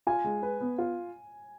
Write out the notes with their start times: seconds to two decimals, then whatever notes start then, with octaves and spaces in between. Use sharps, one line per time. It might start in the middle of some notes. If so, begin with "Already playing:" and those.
0.07 F4 G#5
0.24 G#3
0.43 B4
0.61 B3
0.78 F4